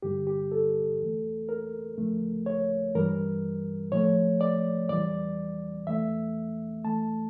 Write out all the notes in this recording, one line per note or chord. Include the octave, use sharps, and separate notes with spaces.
G2 D3 G3 G4
G4
A4
E2 E3 A3
A#4
D2 C#3 F3 A3
C#5
G2 E3 G3 A#4
A2 F3 A3 C#5
D5
E2 E3 G3 D5
E2 E3 A3 E5
E2 E3 A3 A5